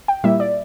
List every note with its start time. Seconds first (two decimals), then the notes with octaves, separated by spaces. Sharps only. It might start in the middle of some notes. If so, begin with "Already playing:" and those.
0.08 G5
0.24 A#2 G3 A#3 E4 E5
0.40 D5